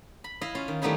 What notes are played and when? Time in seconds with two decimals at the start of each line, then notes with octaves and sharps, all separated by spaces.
0.24 B5
0.41 E4 D#5 F5
0.55 C#4 F4
0.68 D#3
0.82 D#3 G3 A3 B3 D#4 E4